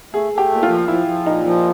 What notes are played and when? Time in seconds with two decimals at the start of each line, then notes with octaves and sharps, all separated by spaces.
0.13 A3 G#4
0.33 A3
0.38 G4
0.51 A#2
0.63 F4
0.69 F3
0.88 F3 E4
1.07 F3
1.26 A#2 D#4
1.45 F3